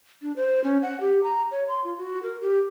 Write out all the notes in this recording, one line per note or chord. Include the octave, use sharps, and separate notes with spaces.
D4
C5
C#4
F#5
G4
A#5
C#5
C6
F4
F#4
A#4
G4